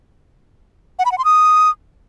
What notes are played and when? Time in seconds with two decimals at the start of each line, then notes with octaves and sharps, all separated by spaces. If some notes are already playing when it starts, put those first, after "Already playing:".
0.99 F#5
1.05 B5
1.12 F#5
1.18 C6
1.25 D#6